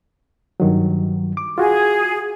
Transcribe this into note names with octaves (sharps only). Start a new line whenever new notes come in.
G2 D#3 F#3
D6
F4 F#4 G#4